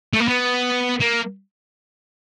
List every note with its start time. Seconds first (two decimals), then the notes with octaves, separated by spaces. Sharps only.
0.13 A3
0.20 A#3
0.28 B3
1.01 A#3